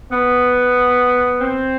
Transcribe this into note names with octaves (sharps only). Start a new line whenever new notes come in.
B3
C4